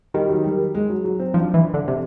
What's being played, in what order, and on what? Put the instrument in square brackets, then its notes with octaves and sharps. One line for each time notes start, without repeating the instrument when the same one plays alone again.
[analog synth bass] D#3 [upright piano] G3
[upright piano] F#3
G3
G#3
F#3
F#3
C4
[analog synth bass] F3 [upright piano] D4
[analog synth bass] E3
D3
C3